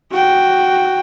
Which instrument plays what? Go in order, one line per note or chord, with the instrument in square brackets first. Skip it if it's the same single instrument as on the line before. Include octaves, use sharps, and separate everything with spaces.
[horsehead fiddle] F#4 G5